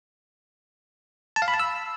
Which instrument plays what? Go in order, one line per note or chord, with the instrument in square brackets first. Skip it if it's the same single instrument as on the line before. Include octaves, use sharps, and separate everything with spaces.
[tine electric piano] A5
F5
B5
A5
E6